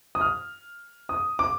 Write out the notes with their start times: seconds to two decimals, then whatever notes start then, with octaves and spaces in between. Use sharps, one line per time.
0.15 D#6
0.21 F6
1.09 D#6
1.39 D6